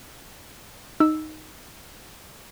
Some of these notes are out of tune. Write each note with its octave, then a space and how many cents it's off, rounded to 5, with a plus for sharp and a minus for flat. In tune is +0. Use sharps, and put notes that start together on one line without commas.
D#4 +0 E6 +0